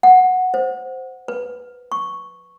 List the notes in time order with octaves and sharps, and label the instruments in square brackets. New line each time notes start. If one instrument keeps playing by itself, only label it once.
[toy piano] F#5
C5
B4
C#6